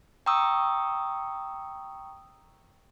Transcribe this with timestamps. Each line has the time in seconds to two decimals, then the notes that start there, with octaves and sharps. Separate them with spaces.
0.26 G5 A#5 C#6 D#6 E6